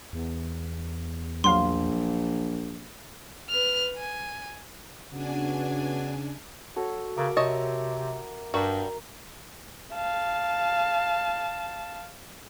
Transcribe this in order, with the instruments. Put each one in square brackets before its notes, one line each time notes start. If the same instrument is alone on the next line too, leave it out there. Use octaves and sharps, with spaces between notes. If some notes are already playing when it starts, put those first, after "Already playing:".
[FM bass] E2
[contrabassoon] A#1 [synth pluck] F#3 F5 [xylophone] C6
[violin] B4 F6
G#5
[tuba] C#3 [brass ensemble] B3 F#4 F#5 [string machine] D4 G#5
[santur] F#4 A4 C#5
[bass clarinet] C#3 [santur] A#4 E5 D6
[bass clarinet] C3 [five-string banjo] C#5 D#5 A5
[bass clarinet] G2 [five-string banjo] G3 F#4 [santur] A#4
[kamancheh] F5 A5